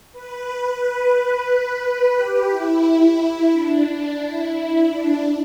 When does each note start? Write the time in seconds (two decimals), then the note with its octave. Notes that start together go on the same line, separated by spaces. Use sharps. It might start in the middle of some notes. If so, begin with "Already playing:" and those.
0.12 B4
0.80 B4
2.16 G4
2.50 E4
3.52 D4
3.86 D4
4.19 E4
4.53 E4
4.87 D4